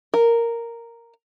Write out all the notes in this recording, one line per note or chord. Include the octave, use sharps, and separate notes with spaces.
A#4